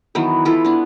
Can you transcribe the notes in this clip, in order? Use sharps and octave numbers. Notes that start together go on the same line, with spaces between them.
D#3 E3 F#3 B3
E3 E4 F4 A4
B3 D4